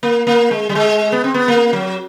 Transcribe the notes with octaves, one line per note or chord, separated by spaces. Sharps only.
A#3
A#3
G#3
G3
G#3
B3
C4
B3
A#3
F#3